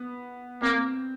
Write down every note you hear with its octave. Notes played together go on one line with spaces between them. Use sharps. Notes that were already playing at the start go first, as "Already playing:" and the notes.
Already playing: B3
A#3 C4